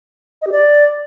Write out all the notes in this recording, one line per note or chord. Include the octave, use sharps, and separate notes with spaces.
D#5
G4
D5